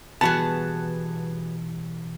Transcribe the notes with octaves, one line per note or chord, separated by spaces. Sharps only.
B2 E3 G3 B3 F#4 G#4 A5